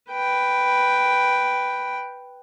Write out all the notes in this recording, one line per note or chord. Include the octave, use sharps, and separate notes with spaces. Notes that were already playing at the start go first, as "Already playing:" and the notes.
B4 G5